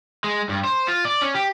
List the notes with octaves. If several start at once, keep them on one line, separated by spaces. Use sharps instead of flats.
G#3
G2
C5
F4
D5
C#4
G4